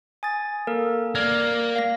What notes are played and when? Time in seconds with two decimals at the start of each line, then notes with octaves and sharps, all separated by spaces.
0.23 G#5 D#6 A6
0.67 A#3 A4 A#4
1.15 A#3 D5 F6 G#6
1.76 F5 A#6